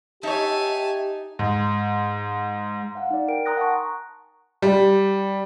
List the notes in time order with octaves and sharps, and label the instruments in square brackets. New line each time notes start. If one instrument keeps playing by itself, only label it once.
[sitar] D#4 [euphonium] G4 [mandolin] C#5 E5 [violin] G#5 A5
[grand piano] G#2
[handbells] F5 F#5
D#4 D5
A#4 G5 D7
A#5 C6 D#6 F#6 A#6
F#5 G#5 A5 C#6
[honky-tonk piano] G3